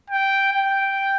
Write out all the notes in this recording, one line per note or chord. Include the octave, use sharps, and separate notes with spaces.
G5
G5